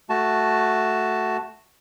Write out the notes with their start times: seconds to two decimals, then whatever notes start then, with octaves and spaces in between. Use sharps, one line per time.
0.10 A3 F#4 A5